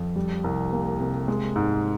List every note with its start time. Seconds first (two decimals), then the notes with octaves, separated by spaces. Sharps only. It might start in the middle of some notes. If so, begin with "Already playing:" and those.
Already playing: F2
0.16 G3
0.44 C2
0.72 A#3
1.00 C3
1.28 G#3
1.56 G#2